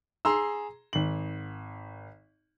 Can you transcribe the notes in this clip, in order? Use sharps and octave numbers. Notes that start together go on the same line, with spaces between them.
G#4 A#5 C6 E6
G#1 F#7